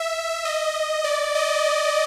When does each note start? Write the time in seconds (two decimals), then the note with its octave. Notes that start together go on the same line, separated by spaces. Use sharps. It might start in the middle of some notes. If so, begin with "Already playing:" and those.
Already playing: E5
0.45 D#5
1.04 D5
1.35 D#5